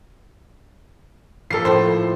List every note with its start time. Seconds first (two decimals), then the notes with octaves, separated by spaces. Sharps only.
1.51 F3 A#3 A4 C7
1.65 A2 F3 E4 C5